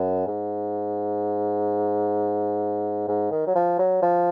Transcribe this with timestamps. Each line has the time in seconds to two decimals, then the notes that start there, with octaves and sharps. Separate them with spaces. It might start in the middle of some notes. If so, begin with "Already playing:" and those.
Already playing: F#2
0.27 G#2
3.08 G#2
3.32 D#3
3.47 F#3
3.55 F3
3.79 F#3
4.02 F3